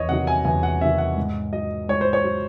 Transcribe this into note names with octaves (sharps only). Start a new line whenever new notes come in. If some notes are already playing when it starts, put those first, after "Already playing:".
Already playing: E2 C#5 D#5
C3 D#3 F#3 F#5
G#5
E2 G#5
F#5
C3 D#3 F#3 E5
F#5
G#2
F#3 D#5
G#2 C#5
C5
C#5
F#3